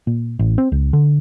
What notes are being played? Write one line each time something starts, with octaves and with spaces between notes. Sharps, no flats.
A#2
A1
C4
C#2
D3